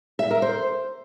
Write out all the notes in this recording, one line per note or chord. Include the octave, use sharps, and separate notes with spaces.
E5
A#4
C5